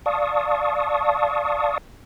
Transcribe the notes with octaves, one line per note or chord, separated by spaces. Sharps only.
D5 F5 A5 C#6 D#6